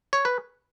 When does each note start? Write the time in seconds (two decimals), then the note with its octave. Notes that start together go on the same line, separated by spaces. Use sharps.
0.13 C#5
0.25 B4